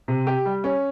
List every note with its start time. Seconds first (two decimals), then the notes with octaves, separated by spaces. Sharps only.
0.08 C3
0.27 G4
0.45 G3
0.64 C#4